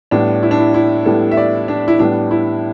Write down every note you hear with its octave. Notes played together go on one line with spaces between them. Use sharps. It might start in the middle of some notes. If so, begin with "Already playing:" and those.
A2 G3 B3 D4
E4
D4
E4
E4
A2 G3 B3 A4
E5
D5
D4
E4
A2 G3 B3 D4
E4